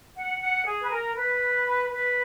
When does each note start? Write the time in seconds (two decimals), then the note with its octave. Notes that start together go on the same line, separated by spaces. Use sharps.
0.16 F#5
0.41 F#5
0.65 G#4
0.82 B4
0.90 A#4
1.16 B4
1.91 B4